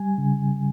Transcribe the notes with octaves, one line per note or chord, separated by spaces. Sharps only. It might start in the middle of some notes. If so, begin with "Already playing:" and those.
Already playing: G3 G#5
C#3